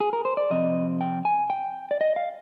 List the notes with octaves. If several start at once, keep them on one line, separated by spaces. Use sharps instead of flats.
G#4
A#4
C5
D5
C3 F3 C4 D#5
G5
G#5
G5
D5
D#5
F5